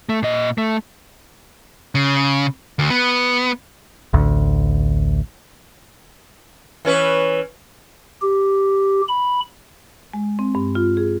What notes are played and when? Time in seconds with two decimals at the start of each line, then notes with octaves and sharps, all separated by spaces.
0.09 A3
0.22 A#2 D#5
0.58 A3
1.95 C#3
2.79 D2
2.90 B3
4.13 A1 D2
6.85 E3 C#4 B4
8.22 G4
9.08 B5
10.14 G#3
10.39 C4
10.55 G2
10.75 F4
10.97 G#4